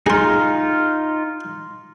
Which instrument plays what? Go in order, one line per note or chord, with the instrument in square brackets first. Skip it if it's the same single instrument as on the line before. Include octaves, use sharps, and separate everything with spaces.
[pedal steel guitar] D#4 F4 [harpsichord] G#4 C6